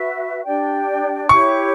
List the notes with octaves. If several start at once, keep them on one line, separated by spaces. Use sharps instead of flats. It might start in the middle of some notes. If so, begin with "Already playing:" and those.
Already playing: F#4 B4 E5
D4 G4 D5 G5
E4 G4 C#5 C#6